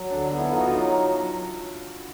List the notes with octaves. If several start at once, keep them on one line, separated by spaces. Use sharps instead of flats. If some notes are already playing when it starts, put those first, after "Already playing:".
Already playing: F#3
D3 D4
B3
E4
D#4 F4
F#4
F4
F#3